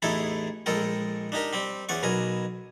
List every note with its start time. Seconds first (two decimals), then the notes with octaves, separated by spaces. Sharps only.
0.02 A1 E2 D#4 E4 G#4 A4
0.66 A#1 G#3 A4 A#4 G5
1.32 D4 D#4 G4 A#4
1.53 G3 C4 G4
1.89 E2 C#4 D5 F#5 C#6
2.03 B1 B2 A#4 G#5